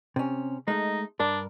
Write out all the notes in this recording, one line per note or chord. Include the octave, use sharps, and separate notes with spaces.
C3 C#4
G#3 A3 D#4
G2 D4 A#4